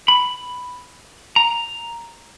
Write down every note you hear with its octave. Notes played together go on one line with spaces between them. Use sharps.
B5
A#5